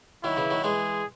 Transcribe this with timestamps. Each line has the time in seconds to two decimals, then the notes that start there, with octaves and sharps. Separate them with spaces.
0.24 D#3 F#3 E4
0.37 C#3 E3
0.50 D#3 F#3
0.64 E3 G#3 G#4